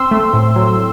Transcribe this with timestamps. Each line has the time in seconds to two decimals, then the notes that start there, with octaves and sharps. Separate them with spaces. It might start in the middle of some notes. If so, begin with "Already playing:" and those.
Already playing: C4 C6 E6
0.11 A3
0.33 A2
0.56 F#3